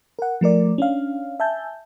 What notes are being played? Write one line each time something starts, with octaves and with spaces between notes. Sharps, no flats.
A#4 F#5
F3 A3 A#4 D5
C#4 D4 F5
E5 G#5 A5 G6